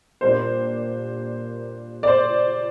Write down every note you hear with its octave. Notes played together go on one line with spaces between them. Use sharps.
A#2 G3 A#3 D4 C5
D5
C5